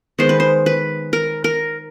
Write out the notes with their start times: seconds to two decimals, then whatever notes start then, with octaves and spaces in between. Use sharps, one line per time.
0.19 D#3 G#3 B3 C5
0.29 B4
0.40 C5
0.66 B4
1.13 A#4
1.44 A#4